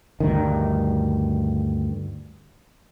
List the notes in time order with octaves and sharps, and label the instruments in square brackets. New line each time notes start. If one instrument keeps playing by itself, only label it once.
[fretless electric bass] D2 G2 D#3